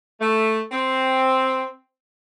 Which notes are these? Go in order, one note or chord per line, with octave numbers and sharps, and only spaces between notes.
A3
C4